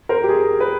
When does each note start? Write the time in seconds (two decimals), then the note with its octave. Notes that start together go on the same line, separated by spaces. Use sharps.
0.09 A#4 C5
0.24 G4
0.29 G#4
0.60 B4